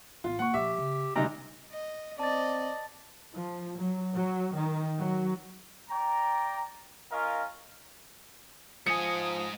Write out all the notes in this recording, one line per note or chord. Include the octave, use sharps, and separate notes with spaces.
A1 B3 F4
A#3 F#5 C#6
A#2 F3 G4 E5
C#3
D2 C3 G3 D#4 A#5
D#5
C4 D5 D#5 A5 A6
F3
F#3
F#3
D#3
F#3
D5 G5 A#5
C#4 F4 A#4 D#5 F5
G#2 F3 G#5 D#6 C#7